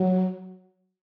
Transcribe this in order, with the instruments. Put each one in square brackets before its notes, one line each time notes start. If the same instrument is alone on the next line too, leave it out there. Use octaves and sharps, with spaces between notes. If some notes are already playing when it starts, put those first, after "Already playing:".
Already playing: [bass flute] F#3